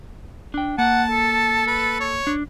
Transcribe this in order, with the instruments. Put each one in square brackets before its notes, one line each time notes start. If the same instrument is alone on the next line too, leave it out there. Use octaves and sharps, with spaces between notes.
[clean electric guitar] D4 G5
[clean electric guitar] A#3 [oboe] F#5 [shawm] A5
[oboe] A4
[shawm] B4
C#5
[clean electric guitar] D4